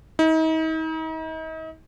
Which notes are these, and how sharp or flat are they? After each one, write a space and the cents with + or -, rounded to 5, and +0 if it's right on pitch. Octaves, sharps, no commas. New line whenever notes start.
D#4 +40